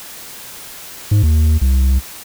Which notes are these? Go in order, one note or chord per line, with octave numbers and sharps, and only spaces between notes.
G#2
D#2
C2